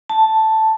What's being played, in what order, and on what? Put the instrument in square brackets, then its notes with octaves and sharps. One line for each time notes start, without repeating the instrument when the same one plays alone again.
[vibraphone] A5